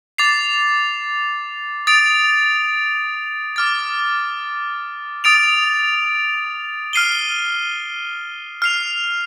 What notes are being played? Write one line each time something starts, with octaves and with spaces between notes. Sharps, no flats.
D6 A6 C7 F7
D#6 A6 D7 F7
D6 F6 A6
D#6 A6 D7 F7
F6 C7 D#7 G7
F6 C7 F7